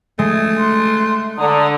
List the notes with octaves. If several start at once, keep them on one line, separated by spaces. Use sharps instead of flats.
G#3 A3
C6 F#6
D3 D5 A#5 D#6